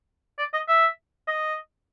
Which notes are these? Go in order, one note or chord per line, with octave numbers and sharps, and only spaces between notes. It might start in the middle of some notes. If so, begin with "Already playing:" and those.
D5
D#5
E5
D#5